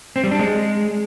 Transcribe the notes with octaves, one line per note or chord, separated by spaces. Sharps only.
C4
G3
D4
G#3